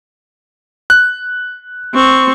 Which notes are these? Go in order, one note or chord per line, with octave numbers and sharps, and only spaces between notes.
F#6
C4 C#6